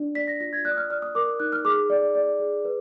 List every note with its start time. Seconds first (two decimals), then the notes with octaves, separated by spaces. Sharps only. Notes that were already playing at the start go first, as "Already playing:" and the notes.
Already playing: D4 D5
0.15 D5 B6
0.28 A#6
0.40 F4 A#6
0.53 G#6
0.65 D5 F#6
0.71 D#6
0.77 F6
0.90 D5 F6
1.02 D#6
1.15 A#4 D6
1.40 D#4 F#6
1.52 F6
1.65 G#4 D6
1.90 D5
2.15 D5
2.40 G#4
2.65 B4